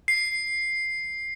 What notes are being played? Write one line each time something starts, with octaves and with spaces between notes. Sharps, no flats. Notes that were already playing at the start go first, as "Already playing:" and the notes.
C7